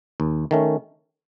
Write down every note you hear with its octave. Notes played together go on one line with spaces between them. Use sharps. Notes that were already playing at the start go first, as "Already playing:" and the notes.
D#2
D#3 A3 C#4